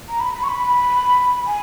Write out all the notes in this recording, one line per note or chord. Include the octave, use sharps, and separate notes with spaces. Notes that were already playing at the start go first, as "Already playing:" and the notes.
A#5
B5
B5
C#6
B5
G#5